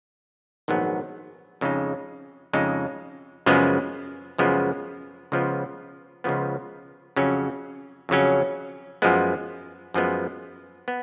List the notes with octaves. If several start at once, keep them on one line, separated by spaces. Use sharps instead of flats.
A#1 G#2 D#3 F#3 B3
F2 C#3 G#3 D#4
F2 C#3 G#3 D#4
F#2 C#3 F3 G#3 B3
F#2 C#3 F3 G#3 B3
C#2 C#3 F3 B3
C#2 C#3 F3 B3
F2 C#3 F#3 C#4
F2 C#3 F#3 C#4
F#2 F3 G#3 B3
F#2 F3 G#3 B3
B3